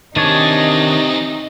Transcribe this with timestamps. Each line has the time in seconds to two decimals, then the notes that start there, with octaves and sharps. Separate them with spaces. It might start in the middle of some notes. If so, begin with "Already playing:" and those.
0.16 C3 D#3 E3 D4 D#4 G#4 C#5